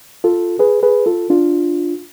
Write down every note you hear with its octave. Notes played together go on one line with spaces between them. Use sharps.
F4 A4
G#4 B4
G#4 B4
F4 A4
D4 F4